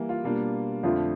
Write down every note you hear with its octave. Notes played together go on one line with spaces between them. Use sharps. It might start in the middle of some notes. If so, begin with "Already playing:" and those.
Already playing: E3 G3 A#3
F4
B2 G3 A#3 D4
F2 D3 F3 A3 D4 F4